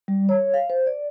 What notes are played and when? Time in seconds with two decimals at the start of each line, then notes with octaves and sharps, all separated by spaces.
0.08 G3
0.29 C#5
0.54 F5
0.70 C5
0.87 D5